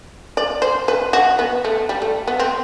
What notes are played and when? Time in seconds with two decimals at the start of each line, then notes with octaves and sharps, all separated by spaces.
0.37 D5
0.62 C5
0.88 B4
1.13 F#4
1.39 B3
1.65 A3
1.89 G3
2.02 A3
2.28 B3
2.39 C4